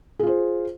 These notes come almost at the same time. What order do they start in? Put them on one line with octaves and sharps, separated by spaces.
G#4 F4 C5